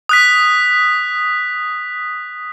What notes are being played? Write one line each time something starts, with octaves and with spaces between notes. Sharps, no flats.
D#6 F#6 B6